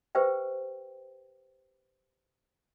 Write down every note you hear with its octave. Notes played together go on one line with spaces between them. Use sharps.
G4 B4 C5 E5 G5